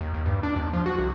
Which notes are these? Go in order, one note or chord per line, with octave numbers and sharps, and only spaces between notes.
D#2
D#2
G2
D4
D#2
F3
F#4
C2